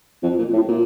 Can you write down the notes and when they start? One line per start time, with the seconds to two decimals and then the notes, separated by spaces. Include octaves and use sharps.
0.23 F2
0.39 A#2
0.53 A2
0.68 A#2